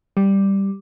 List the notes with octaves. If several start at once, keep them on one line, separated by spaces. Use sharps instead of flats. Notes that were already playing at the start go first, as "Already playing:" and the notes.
G3